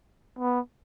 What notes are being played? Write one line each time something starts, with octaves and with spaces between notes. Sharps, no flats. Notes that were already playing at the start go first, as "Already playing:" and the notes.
B3